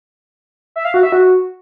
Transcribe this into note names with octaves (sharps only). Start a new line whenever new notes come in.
E5
F5
F#4
E5
F#4